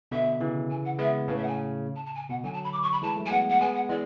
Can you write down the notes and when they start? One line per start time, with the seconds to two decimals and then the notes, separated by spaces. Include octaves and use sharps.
0.11 B2 D3 E5
0.40 C#3 E3
0.70 G#5
0.85 F#5
0.98 G#3 B3 E5
1.28 A2 C#3 B4
1.37 E5
1.43 F#5
1.47 G#5
1.95 A5
2.05 A5
2.15 G#5
2.29 B2 F#5
2.43 D3 F#3 G#5
2.53 A5
2.64 B5
2.72 D6
2.82 C#6
2.92 B5
3.02 E3 G#3 A5
3.16 F#3 A3
3.25 G#5
3.31 G#3 B3 F#5
3.49 F#5
3.60 G#3 B3 G#5
3.75 F#5
3.89 E3 G#3 D5